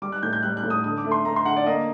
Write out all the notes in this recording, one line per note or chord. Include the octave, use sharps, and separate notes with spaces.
G3 D6
F#6
A2 G6
G6
G3 F#6
F#6
A2
D#6
D3 D#6
D6
A3
C6
A3 A#5
C6
D3 F#5
D5
A#3 D#5